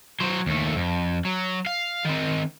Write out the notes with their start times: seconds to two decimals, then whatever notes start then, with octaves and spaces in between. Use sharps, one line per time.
0.20 F#3 C5
0.46 D#2 A3
0.76 F2
1.25 F#3
1.66 F5
2.05 D#3 C4